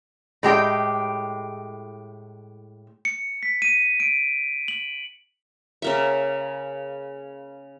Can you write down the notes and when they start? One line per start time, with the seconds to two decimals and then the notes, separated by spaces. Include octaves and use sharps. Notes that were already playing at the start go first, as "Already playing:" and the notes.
0.43 A2 G#3 G4 G5
3.05 C#7
3.43 B6
3.62 D#7
4.00 D7
4.68 F#7
5.82 C#3 A#3 E5